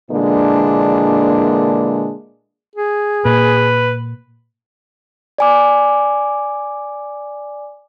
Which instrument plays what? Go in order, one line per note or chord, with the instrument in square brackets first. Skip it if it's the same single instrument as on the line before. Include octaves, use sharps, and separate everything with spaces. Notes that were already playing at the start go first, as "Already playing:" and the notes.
[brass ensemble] A#2 D3 E3 G#3 A#3 D4
[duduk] G#4
[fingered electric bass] A#2 [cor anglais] B4
[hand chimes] D5 G#5 D6